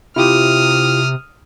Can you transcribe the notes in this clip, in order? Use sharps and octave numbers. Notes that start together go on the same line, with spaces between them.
C3 E4 F4 G4 D#6 F6